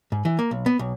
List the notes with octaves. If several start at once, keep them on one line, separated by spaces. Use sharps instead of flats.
G#2
E3
A#3
B1
B3
B1